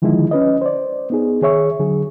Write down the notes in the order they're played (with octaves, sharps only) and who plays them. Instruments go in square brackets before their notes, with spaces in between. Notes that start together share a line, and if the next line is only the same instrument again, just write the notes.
[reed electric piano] D3 D#3 F3 G#3 D#4 E4
C#4 B4 D#5
C5 D5
B3 D#4 G#4
D#3 G#4 C#5 E5 C#6
D3 F#3 G#4